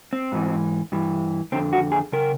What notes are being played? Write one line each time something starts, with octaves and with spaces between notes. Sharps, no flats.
C4
G#2 E3
G2 E3
F2 D3 C4
F#4
G#4
C#3 A#4